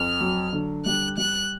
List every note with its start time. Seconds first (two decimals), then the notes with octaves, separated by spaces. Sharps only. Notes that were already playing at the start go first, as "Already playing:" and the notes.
Already playing: F2 F6
0.21 F#3
0.53 D3
0.86 G3 F#6
1.18 G3 F#6